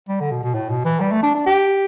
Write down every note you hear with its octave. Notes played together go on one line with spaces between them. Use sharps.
G3
D3
B2
B2
A2
B2
E3
G3
A3
D4
D4
G4